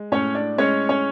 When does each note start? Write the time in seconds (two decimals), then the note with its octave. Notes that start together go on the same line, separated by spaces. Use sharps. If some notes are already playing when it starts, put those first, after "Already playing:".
Already playing: G#3
0.12 A2 C#4 C#5
0.35 D4 D5
0.58 G#3 C#4 C#5
0.89 C#4 C#5